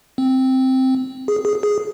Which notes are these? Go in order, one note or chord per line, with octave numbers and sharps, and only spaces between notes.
C4
G#4
G#4
G#4